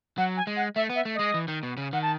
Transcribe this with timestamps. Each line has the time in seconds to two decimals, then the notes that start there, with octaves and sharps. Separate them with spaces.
0.17 F#3 F#5
0.37 G#5
0.47 G#3
0.56 F#5
0.75 A3 E5
0.90 B3
0.95 E5
1.05 A3
1.15 G#3 D#5
1.34 E3
1.48 D#3
1.63 B2
1.77 C#3
1.92 D#3 F#5
2.02 A5